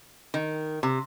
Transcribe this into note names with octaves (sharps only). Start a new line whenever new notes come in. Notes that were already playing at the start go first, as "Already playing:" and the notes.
D#3
C3